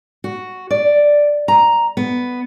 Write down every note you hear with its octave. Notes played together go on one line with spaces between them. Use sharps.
F#4
D5
A#5
B3